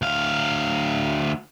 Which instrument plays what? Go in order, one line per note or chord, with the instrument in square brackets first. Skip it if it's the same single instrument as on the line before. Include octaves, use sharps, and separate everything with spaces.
[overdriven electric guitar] D2 F5